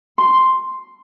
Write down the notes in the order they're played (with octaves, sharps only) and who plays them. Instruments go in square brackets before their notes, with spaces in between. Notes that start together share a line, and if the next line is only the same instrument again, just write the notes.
[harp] C6